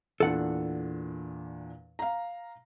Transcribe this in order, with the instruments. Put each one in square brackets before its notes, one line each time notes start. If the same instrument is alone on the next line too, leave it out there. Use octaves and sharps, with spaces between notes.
[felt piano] E2 A#2 D4 [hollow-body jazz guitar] A4 F#5
[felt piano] F5 A#5